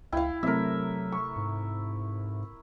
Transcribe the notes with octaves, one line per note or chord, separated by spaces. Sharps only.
C#2 E4 F5 G5
C3 F#3 A3 A#4 E5
C#6
G#2